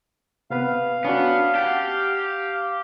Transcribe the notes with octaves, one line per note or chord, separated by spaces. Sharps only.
C3 B3 B4 F5
B3 C#4 D4 F#4
G4 F#5 A5